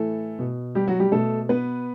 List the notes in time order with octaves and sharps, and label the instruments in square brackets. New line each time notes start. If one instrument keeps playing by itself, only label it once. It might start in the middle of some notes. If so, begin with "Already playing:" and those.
Already playing: [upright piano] A2 E3 A3 A4
B2
G3 G4
F#3 F#4
G3 G4
B2 A3 A4
B3 B4